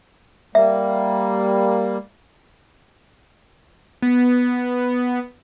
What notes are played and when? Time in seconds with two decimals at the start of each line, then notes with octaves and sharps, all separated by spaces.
0.55 G3 A#3 E5
4.02 B3